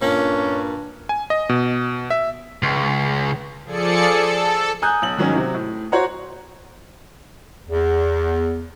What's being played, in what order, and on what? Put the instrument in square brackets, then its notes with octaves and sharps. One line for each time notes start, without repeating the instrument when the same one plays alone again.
[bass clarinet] G2 [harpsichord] A#2 A#3 D4 [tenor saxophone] C#4
[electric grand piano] G#5
D#5
B2
E5
[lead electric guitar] C#2
[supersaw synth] F3 G#4 A4 D5 C#7
A4
[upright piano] G#5 A#5 D#6 F#6 G6
B1 F#7
G#2 D#3 F#3 C#4
C3 F#3
A2
F#4 C5 C#5 F#5 A#5
[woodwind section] E2